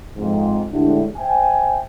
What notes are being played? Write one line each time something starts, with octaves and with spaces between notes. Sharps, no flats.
F2 G#2
A2 D3 G#3 D4 E4 G4
C5 E5 G5 G#5